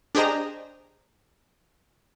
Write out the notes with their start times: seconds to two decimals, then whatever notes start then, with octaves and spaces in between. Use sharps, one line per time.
0.15 D4 G4 G#4 C5 D#5 A#5